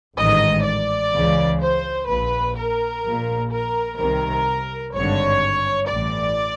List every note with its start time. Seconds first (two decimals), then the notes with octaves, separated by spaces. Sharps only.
0.18 A1 G#2 D#3 D#5
0.66 D5
1.14 C#2 C#3 E3
1.61 C5
2.08 A#1 A#2 B4
2.56 A#4
3.04 A#1 A#2
3.51 A#4
3.99 C2 C3 D#3 A#4
4.94 G#1 G2 D3 C#5
5.89 A1 A2 E3 D5